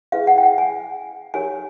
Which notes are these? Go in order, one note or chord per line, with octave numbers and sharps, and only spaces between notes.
C#4 E4 G#4 B4 F5
F#5
G5
F#5
G#5
D#4 G4 A#4 C#5 G#5